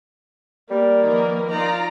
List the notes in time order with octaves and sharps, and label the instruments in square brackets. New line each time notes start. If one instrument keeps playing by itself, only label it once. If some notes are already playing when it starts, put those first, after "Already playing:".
[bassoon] G3 [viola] A#3 [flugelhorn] D5
[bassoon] D#3 [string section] F3 A#4 B4
[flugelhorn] D#4 [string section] F4 D5 [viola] A#5